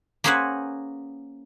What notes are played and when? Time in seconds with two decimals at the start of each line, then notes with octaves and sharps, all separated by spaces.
0.24 A#3 C#4 G#4 B4 C5 F#5